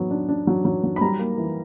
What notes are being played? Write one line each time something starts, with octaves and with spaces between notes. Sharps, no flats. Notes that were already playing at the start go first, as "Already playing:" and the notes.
Already playing: F#3 B3
D4
D4
F#3
F#3
F#3
B5
G3 A#5
A#3
E3